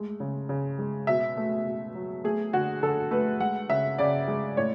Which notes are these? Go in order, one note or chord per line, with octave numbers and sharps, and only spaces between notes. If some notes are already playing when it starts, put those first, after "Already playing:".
Already playing: G#3 A3
C#3
C#3
G#3
B2 E5
A3
B2
F#3
A3 G#4
D3 F#4
D3 A4
A3 B4
G#3 F#5
C#3 E5
C#3 D5
G#3
A2 C#5